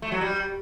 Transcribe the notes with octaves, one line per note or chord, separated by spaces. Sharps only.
A3
F#3
G3